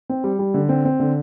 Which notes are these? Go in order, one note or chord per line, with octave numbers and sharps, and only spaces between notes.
C4
G3
G3
D3
C4
C4
D3